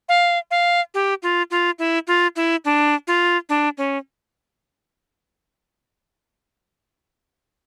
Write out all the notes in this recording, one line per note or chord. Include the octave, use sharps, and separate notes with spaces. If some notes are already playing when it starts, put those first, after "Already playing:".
F5
F5
G4
F4
F4
E4
F4
E4
D4
F4
D4
C#4